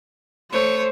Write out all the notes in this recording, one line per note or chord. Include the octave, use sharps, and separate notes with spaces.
A3 C5 C#5